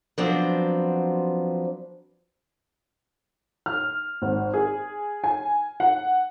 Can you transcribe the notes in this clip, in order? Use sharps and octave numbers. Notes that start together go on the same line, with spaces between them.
F3 F#3 B3 C4 D4
F6
G#1
G#4
G#5
F#5